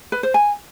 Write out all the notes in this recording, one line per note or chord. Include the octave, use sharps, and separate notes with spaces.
B4
C5
G#5